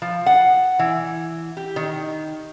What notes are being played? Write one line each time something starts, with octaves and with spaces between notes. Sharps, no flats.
F3
F#5
E3
G4
D#3